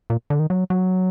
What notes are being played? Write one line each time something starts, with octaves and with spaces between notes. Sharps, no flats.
A#2
D3
D#3
F#3
F#3